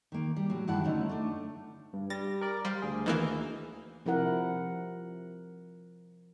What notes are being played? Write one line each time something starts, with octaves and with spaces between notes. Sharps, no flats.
D#3 A#3
G3
A2 F#3
G2 D#3 F#3 E4 F#5 A5
D3 A3 C#4 D#4
A3 D4
G2
G3 A6 A#6
A#4 D5
G3 C5 F5
D2 G#4
D#3 E3 A#3
C3 F3 E4 A#4 F#5